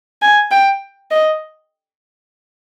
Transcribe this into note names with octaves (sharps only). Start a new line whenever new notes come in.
G#5
G5
D#5